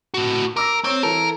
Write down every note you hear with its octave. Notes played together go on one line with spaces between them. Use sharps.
A2 F#4
A#4 D6 E6 A#6
C4 C#5 C#6 E6
E3 A4 A#4